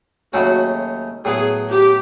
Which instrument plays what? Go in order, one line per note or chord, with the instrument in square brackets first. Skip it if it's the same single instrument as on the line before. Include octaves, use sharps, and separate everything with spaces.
[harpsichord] D#2 C#3 F#3 A3 C#4 [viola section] F#4
[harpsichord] A2 F#3 B3 [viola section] G#4
[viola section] G4